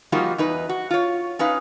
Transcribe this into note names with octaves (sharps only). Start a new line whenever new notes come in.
F3 G3 A#3 D#4 F4 F#4
E2 D#4 B4
F#4
F4 C#5
C#4 D#4 B4 F5